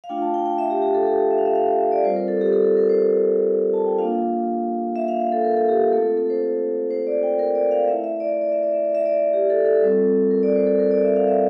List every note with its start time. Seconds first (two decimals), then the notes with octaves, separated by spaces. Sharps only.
0.04 F5
0.09 A3 D4 F4 G5
0.22 A5
0.34 G5
0.46 G5
0.58 E5
0.70 G4
0.82 G4
0.94 A4
1.07 G4
1.31 E5
1.38 F5
1.46 E5
1.55 F5
1.67 E5
1.79 E5
1.92 D5
2.04 G3 C4 F4 C5
2.16 A#4
2.28 A4
2.41 G4
2.53 A4
2.65 A4
2.77 A#4
2.89 C5
3.73 A5
3.86 G5
3.98 A#3 D4 F4 F5
4.96 E5
5.08 F5
5.20 F5
5.32 A4
5.44 A#4
5.57 A4
5.69 G4
5.81 A4
5.93 A3 C4 F4 A4
6.06 A4
6.17 A4
6.30 C5
6.91 C5
7.07 D5
7.23 G5
7.39 A#4
7.55 D5
7.71 F5
7.88 A3 E4 E5
8.04 E5
8.20 D5
8.31 E5
8.41 D5
8.52 E5
8.63 D5
8.73 E5
8.85 D5
8.95 E5
9.06 D5
9.33 G4
9.50 A4
9.66 A4
9.82 G3 C4 F4
10.31 A#4
10.43 D5
10.55 C5
10.67 A4
10.79 A#4
10.91 D5
11.03 E5
11.16 F5
11.28 E5